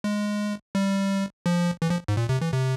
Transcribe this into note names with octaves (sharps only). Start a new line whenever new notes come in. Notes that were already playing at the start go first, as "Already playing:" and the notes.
G#3
G3
F3
E3
F3
G#2
A#2
C3
E3
C3